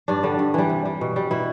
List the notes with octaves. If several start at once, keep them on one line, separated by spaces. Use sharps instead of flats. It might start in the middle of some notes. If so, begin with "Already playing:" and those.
G2 D4
D3 G3
G2
E3 G3
C3
G3
B2
G3
B2 E4